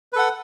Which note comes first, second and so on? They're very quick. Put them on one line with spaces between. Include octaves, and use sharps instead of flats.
B4 A4 F#5